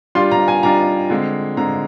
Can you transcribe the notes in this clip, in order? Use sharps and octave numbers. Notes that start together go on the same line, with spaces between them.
G3 D4 F4 C6
A#5
G#5
G3 D4 F4 A#5
D3 G#3 C4
D3 G#3 C4 A#5